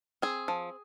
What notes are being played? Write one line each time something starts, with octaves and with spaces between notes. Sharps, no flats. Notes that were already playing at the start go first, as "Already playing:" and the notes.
C4 G#4
F3